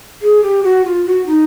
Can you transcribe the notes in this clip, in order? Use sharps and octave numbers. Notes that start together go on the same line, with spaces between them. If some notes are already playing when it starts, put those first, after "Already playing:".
G#4
G4
F#4
F4
F#4
D#4